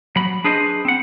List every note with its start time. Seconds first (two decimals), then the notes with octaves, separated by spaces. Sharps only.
0.16 F#3 B5
0.44 D4 G#4 B4 C5 D#5
0.85 C4 F#5